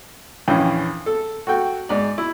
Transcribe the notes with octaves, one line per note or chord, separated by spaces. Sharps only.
A#1 E2 E3 C#4 G5
A4
F#4 A4 G5
G#2 D5
E4